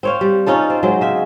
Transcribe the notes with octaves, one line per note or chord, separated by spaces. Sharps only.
C4 C#5 F5
G3
C#4 D#4 F4 A4
C4
F#3 G#3 C4
C#3 E5